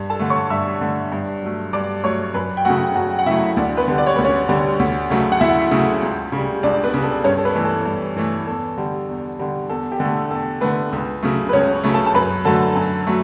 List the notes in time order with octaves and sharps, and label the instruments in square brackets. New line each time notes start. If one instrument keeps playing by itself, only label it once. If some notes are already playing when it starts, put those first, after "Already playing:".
Already playing: [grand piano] G2
A4 A5
D3 A3
C#5 C#6
G2 E5 E6
D3 A3
G2
F#3 A3
G2 D5 D6
F#3 A3 C#5 C#6
F#2 B4 B5
G5
C#3 F#3 A3 F#4 F#5
F#2 F#4 F#5
F#5
C#3 F#3 A3 E4 E5
D2 D4 D5
B3 B4
D3 G3
D5
C#5
D2 B4
C#4 C#5
D3 G3
D2
C#3 F#3 A3
F#5
D2 E4 E5
C#3 F#3 A3
C#2
C#3 G3
C#2 D4 D5
B3 B4
C#3 G3
A4
G2 C#4 C#5
A4
B3 B4
E3 A3
A4
G2
E3 A3
E2 A4
D3 G3
E2
D3 G3
E2 A4
G4
D3 A4
A3
E2 A4
D3 A3 B3 B4
C#2
C#3 F#3 A3
B4
C#2 C#4 C#5
C#3 F#3 A3
A4 A5
A5
F#2 B4 B5
D3 F#3 A3 A4 A5
F#2
F#3 A3